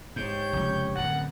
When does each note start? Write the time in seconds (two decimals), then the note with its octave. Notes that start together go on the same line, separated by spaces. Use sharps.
0.16 G#2 G4 C#5 G6
0.53 F1 C#2
0.95 D1 F#2 F#5